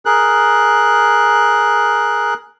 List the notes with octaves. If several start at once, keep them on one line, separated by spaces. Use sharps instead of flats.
G#4 A#4 F#6